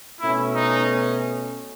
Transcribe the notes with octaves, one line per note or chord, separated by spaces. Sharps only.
B2 A3 C#4 E4
D#4